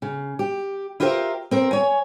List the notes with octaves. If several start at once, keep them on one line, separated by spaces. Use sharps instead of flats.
C#3
G4
E4 F4 G4 A#4 C5 E5
C4 A#4 C5
C#5 G#5